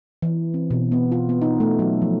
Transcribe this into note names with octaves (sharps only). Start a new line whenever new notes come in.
E3
C4
B2
B3
F4
B3
D#4
A3
F#3
F3